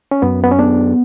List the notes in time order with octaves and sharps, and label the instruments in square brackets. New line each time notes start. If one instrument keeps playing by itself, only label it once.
[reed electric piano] C#4
[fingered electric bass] F#2 [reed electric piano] B3
[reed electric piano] B3
C#4
[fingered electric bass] B3 [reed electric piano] D4